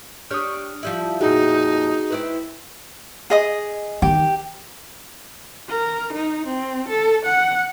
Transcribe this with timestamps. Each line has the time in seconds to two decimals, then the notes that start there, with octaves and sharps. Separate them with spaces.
0.31 D4 G4 C#5 D#6 F6
0.83 F3 G3 E4
1.21 F2 A#2 D#4 F#4 G#4
2.10 C4 E4 B4
3.30 G#4 D#5 D#6
4.02 D#3 G4
5.69 A#4
6.14 D#4
6.47 C4
6.89 A4
7.25 F#5